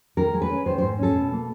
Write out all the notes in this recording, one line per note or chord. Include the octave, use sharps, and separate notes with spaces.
D#3 A#4
G#3
B4
C#4
D#3 C5
C5
G#2
C#4 A4
B2
A#3